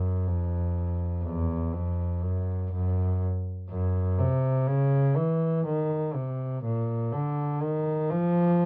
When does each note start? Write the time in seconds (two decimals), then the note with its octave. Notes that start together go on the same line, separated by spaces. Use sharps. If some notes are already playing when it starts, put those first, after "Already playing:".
Already playing: F#2
0.27 F2
1.24 E2
1.73 F2
2.22 F#2
2.72 F#2
3.70 F#2
4.19 C3
4.68 C#3
5.16 E3
5.66 D#3
6.14 C3
6.64 A#2
7.13 D3
7.62 D#3
8.10 F3